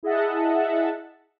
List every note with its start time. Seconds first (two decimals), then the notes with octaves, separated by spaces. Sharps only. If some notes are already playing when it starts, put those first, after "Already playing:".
0.03 E4 G#4 D#5 E5 F#5 A5